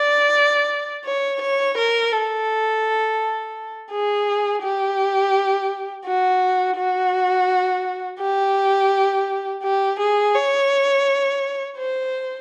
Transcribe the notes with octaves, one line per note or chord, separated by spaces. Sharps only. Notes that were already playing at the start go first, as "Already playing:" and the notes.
Already playing: D5
C#5
C#5
A#4
A4
G#4
G4
F#4
F#4
G4
G4
G#4
C#5
C5